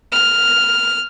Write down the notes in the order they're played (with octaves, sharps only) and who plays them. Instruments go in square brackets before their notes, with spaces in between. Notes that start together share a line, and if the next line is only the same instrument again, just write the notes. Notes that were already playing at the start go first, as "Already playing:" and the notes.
[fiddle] F6